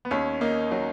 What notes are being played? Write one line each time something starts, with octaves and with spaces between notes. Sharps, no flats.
B3
D#2 C#4
A#3 D#4
F#3 D#4